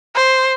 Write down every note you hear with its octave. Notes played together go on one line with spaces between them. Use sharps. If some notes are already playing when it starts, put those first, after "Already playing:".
C5